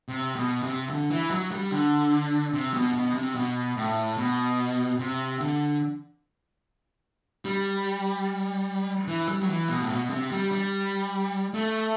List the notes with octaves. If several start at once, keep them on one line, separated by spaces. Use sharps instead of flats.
C3
B2
C3
D3
E3
F#3
G3
D3
C3
B2
B2
C3
B2
A2
B2
C3
D3
G3
E3
G3
F#3
E3
B2
A2
B2
C3
G3
G3
A3